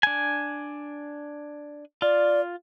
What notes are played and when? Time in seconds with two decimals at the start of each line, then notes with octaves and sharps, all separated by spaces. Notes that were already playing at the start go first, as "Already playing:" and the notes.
0.03 D4 G#5
2.02 F4 D5